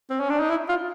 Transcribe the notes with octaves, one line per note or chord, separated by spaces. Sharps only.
C4
C#4
D4
D#4
E4
F4